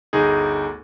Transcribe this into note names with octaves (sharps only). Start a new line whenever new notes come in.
G1 D2 D#4 G#4